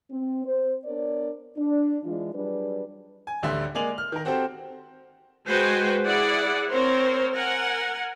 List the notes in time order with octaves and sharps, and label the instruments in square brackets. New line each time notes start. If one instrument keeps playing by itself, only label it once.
[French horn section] C4
C5
B3 D4 A#4 C#5 D5
D4
E3 G#3 D4 E4 F4
F#3 G3 D4 G#4 B4
[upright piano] G#5
A1 D2 D3 G3 E5 C6
G#3 A#3 D5 G#5 F7 F#7
F6
D#3 A#4
C4 F#4 G4 A4 C5 G5
[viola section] G#3 F#4 B4 C5 G5 G#5
E4 G#4 D5 F#5
C4 A#4 C5 C#5
A#4 F#5 G#5